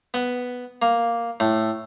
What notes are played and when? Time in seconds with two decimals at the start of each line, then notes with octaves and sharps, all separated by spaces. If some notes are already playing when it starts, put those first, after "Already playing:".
0.14 B3
0.82 A#3
1.40 A2